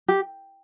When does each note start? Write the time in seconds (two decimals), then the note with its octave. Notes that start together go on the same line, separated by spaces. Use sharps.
0.08 G4